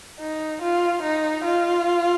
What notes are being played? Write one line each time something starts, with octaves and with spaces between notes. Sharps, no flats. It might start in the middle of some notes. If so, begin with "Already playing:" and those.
D#4
F4
D#4
F4